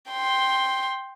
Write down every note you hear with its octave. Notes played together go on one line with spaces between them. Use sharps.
G5 C6